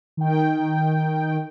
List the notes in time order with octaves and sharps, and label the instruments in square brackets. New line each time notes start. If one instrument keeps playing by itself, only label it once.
[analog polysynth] D#3 G5